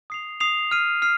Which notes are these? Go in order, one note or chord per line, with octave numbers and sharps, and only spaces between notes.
D#6 C7 F7
D#6 C7 F7
F6 C7 D#7
F6 C7